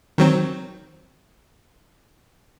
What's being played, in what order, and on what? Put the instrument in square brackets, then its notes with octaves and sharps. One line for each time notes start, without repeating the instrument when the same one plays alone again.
[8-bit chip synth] D#3 F#3 C4